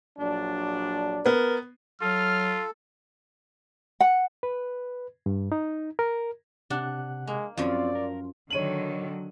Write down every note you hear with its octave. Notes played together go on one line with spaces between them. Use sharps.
A#1 F#3 D4
B3 A#4
F#3 F4 A4 F6
F#5
B4
G2
D#4
A#4
C3 D4 F#5 F#6
G#3 A#3
F#2 F3 C4 F4 D5 F5
A#4
D3 D#3 F#3 C#5 D#7 F#7